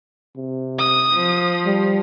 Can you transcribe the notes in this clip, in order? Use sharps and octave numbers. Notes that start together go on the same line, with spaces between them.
C3
D#6
F3
G3